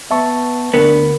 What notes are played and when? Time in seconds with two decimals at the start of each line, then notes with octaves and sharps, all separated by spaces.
0.11 B3 E5 A5 C#6
0.74 D2 B3 D4 A#4